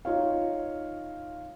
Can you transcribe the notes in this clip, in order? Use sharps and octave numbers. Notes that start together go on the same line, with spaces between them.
D#4 F4 C#5 F5